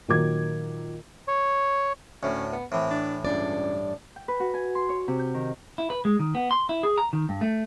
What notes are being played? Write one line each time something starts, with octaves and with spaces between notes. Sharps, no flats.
A#2 D#3 F#3 A#4 D6 G#6
C#5
D2 A2 C#4
B3
A2 E3 C4
D4
C#2 G2 D4 D5
G5
B4
F#4
G#5
C6
C#5
C3
G6
D#3
E4
B4
G#3
D#3
B3
C6
E4
G#4
A#5
D#3
G2
A3